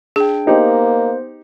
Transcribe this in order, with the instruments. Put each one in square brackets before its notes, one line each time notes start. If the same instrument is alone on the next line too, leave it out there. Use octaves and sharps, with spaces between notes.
[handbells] D4 G5 [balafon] G#4
[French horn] A#3 [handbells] B3 C5 D#5 [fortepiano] D#4 G4